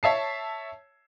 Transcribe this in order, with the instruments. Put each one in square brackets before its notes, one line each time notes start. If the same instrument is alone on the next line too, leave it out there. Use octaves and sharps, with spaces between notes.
[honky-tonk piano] C#5 E5 A5 C7